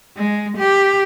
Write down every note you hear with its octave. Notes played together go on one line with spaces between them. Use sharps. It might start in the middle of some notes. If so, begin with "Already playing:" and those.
G#3
G4